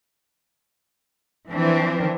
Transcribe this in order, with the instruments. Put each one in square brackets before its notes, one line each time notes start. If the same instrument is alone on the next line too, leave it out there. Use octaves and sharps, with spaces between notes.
[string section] E3 F3 C4 D4